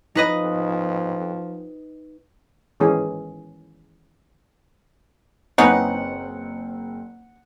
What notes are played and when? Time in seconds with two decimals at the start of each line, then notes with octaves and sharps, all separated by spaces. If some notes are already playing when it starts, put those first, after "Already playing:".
0.15 F3 D#4 B4 D#5
2.80 D#3 E3 G#3 C#4 G#4
5.58 F#1 C4 C#4 D#4 B4 D#5 F#5